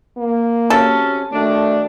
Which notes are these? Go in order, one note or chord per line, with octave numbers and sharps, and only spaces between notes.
A#3
C3 F#3 C#4 A4
D#3 F#3 A3 D4